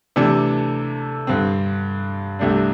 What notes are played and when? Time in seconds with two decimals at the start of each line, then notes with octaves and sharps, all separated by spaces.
0.16 C3 E3 A3 D4 A4
1.27 G2 D3 C4
2.39 C2 C3 A3 D4